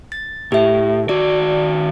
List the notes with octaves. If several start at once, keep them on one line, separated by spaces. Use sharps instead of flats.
A6
A2 G4 E5
D#3 F#4 D5